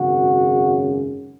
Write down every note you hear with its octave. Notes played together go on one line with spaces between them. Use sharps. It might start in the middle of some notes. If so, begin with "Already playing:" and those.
Already playing: G#1 F#2 C#3 F#4